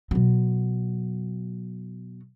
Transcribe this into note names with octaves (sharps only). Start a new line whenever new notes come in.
B2 F#3